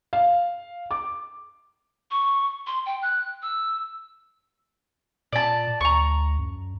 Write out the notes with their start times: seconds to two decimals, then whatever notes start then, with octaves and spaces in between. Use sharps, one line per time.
0.13 F5
0.91 D6
2.11 C#6
2.67 C6
2.86 G5
3.02 F#6
3.43 E6
5.33 A#2 D5 A5
5.81 D2 A#5 C#6
6.39 F#2